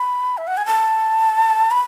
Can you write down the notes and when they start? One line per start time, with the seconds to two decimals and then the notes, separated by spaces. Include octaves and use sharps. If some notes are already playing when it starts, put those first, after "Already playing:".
Already playing: B5
0.38 E5
0.47 F#5
0.57 G#5
0.66 A5
1.71 B5